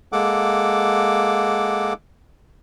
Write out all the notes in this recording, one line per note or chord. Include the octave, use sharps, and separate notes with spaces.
G#3 A#3 A4 F#5 D6